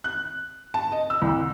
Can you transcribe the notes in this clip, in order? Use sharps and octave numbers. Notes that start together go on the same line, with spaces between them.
F#6
A5
D#5
E6
C2